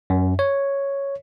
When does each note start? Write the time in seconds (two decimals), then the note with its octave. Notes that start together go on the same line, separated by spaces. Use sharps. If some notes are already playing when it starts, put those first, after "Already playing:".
0.10 F#2
0.39 C#5